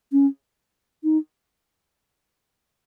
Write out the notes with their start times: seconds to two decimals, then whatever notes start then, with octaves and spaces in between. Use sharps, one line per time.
0.12 C#4
1.04 D#4